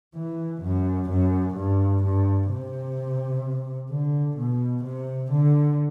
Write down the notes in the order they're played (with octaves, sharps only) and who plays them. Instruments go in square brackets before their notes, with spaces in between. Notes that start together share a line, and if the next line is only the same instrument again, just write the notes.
[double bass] E3
F#2
F#2
G2
G2
C3
D3
B2
C3
D3